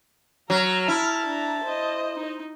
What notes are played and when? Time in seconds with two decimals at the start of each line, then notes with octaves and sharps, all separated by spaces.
0.50 F#3 A#5 F6
0.88 E4 A5
1.26 D4 A#5
1.63 C5 D#5
2.16 D#4